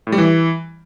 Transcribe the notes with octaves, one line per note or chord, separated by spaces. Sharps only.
A2
G3
E3